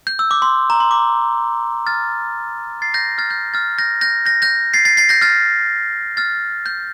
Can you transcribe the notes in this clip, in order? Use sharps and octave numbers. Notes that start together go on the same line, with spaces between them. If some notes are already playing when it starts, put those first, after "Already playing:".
G6
E6
D6
C6
A#5
C6
D6
F6 A6
A6 C7
G6 A#6
F6 A6
G6
F6 A6
G6 A#6
G6 A#6
G6 A#6
G6 A#6
A6 C7
A6 C7
A6 C7
G6 A#6
F6 A6
F6 A6
G6